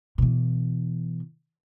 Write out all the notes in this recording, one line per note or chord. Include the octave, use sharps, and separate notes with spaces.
B2 E3